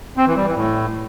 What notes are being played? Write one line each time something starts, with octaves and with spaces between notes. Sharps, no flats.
C4
E3
G3
E3
A2